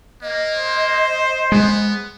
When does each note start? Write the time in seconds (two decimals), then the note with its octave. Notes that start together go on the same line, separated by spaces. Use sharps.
0.22 A#3 D#5
0.56 C5
1.52 G#3 B3